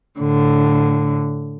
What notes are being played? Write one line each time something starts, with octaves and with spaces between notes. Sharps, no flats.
A2 D3